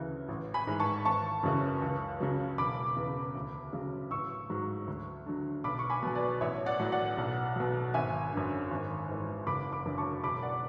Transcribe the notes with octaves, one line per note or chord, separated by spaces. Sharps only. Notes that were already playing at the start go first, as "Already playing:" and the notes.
Already playing: D2 C#3 E3
A1
G#5 B5
G#2 E3
A5 C#6
G#1 A5 C#6
F#2 C#3 E3
C#2
C#3 F#3
E1 B5 D6
E2 C#3
D2
C#3 F#3
A1 C#6 E6
G#2 F#3
D2
D3 F#3
B1 B5 D6
C#6
G#5 B5
B2 F#3
B4 D5
A1 C#5 E5
D5 F#5
A2 F#3
D5 F#5
B1
B2 F#3
G#1 E5 G#5
F#2 D3
G#1
G#2 E3
F#1 B5 D6
B5 D6
F#2 D3 F#3
A5 C#6
E1 B5 D6
D5 F#5